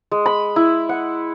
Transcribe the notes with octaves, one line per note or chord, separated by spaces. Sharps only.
G#3
B5
E4
F#5